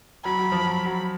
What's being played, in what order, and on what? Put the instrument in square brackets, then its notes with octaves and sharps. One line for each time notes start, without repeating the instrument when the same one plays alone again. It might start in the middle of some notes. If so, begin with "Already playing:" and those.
[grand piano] F#3 [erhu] B5
[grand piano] F#3
F3
F#3
F#3